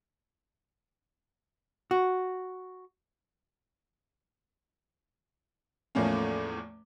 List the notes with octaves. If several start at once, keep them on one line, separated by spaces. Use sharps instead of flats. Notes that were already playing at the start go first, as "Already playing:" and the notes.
F#4
E2 A2 F3 A3 A#3 C#4